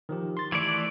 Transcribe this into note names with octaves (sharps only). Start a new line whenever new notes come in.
D#3 F3 G4
C6 A6
E3 A3 D5 G#6